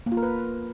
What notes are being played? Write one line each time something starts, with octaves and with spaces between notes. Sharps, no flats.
A#3
F4
A#4
B4